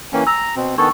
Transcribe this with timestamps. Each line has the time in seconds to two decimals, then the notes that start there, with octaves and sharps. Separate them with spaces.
0.13 E3 A#3 C#4 G5 G#5
0.27 A#5 E6
0.56 B2 C4
0.78 D#3 B3 D4 A4 C#6